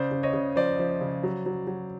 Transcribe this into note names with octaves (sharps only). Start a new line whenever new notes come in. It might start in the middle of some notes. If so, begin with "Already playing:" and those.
Already playing: C#3 C5 D5
C#3
C#5 D#5
C#3
F3 C5 D5
F3
C#3
F#3
F#3
F#3